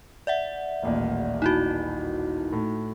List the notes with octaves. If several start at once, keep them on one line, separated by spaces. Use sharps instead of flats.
D5 E5 F#5
D#1 A1 A#2
D#4 E4 F#4
A2